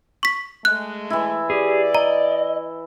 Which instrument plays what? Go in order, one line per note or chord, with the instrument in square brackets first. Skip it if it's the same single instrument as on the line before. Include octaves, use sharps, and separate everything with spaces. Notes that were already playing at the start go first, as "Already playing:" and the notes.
[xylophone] C#6 B6
[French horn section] G#3 A3 [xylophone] F#6
[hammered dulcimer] E3 E4
[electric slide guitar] G4 G#4 [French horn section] D5
[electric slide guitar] D#5 [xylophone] A#5